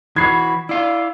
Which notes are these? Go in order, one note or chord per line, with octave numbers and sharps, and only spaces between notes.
E3 F#4 B5 G#6 C7
E4 D5 F5